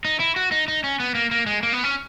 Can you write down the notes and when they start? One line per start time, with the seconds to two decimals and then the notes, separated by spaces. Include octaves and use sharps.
0.05 D#4
0.20 E4
0.36 F#4
0.52 D#4
0.68 D#4
0.84 C#4
1.00 B3
1.15 A#3
1.31 A#3
1.46 G#3
1.63 A#3
1.73 B3
1.84 C#4